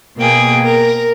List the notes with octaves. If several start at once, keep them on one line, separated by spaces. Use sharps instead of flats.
B2 A#3 G#4 G5
A#4